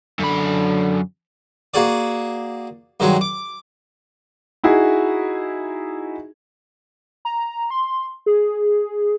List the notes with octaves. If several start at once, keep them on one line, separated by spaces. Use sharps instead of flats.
F#2 D3 B5
A#3 F#4 G#4 D5
G2 D#3 F#3 G#3
D6
D#4 E4 F#4 G#4
A#5
C6
G#4